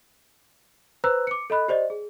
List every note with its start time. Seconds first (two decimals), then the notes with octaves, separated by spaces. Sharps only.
1.04 B4 C5 A#5 E6 F#6
1.27 D6 C#7
1.50 A4 D#5 B5 F#6
1.68 G4 C5 D5 D#5
1.90 G#4